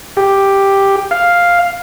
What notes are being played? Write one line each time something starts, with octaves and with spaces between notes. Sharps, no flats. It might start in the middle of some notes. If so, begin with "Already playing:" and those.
G4
F5